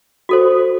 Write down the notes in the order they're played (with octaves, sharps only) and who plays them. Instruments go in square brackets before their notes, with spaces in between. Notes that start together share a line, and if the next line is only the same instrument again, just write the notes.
[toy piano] F#4 A4 C5